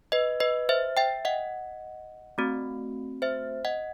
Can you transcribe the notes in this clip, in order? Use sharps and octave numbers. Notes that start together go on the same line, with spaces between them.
B4 D#5
B4 D#5
C5 E5
E5 G5
D#5 F#5
A3 C4 F#4
C5 E5
D#5 F#5